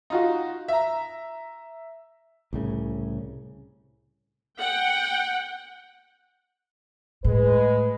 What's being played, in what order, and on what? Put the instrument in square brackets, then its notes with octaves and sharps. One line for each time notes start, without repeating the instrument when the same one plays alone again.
[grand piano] D#4 F4 F#4
E5 A#5
[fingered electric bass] C2 A2 C#3
[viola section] F#5 G5
[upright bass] A2 [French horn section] G#3 B4